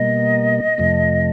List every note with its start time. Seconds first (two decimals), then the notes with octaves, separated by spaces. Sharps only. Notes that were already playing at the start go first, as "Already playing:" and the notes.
Already playing: B2 G3 A#3 D#5
0.78 F2 C3 F3 A3